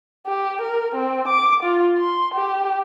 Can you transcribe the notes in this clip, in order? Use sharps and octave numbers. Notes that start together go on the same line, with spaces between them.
G4
A#4
C4
D6
F4
C6
G4